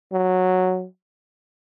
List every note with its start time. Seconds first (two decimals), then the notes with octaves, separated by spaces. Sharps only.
0.13 F#3